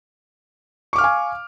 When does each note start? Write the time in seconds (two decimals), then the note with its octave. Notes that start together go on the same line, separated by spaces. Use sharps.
0.93 C#6
0.96 D6
0.98 F6
1.01 F5
1.04 G#5